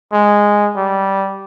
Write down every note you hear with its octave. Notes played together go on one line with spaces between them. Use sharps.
G#3
G3